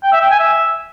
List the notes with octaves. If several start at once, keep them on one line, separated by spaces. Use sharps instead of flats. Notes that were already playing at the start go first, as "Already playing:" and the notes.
G5
E5
G5
G#5
E5